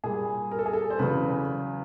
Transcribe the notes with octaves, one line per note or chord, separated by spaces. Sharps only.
A#2 G3 G#4
A#4
A4
G#4
A4
C5
E2 C#3 F#3 B4